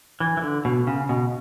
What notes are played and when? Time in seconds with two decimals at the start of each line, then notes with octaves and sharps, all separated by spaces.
0.20 E3
0.37 E3
0.42 D3
0.65 B2
0.87 C#3
1.09 B2